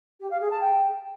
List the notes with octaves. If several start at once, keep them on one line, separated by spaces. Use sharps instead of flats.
G4
F5
G#4
A5
G5